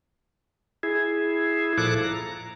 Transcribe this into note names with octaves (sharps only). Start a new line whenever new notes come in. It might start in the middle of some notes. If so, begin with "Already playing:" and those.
E4 G#4
A#2 F3 E4 A4 D6 F#6
A#5